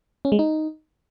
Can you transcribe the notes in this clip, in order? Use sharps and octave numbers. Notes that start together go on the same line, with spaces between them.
C#4
G#3
D#4